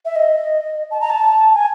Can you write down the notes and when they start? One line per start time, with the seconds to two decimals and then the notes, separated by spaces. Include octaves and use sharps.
0.05 E5
0.16 D#5
0.91 A5
1.01 A#5
1.10 A5
1.54 G#5